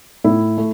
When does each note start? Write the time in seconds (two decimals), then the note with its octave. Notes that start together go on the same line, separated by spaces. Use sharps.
0.24 A2 E4
0.58 A3